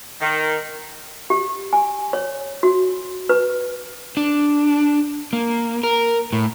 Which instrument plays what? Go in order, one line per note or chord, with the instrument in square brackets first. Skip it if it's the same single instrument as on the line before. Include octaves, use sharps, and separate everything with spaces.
[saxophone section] D#3
[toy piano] G4
G#5
C#5
F#4
B4
[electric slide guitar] D4
A#3
A#4
A2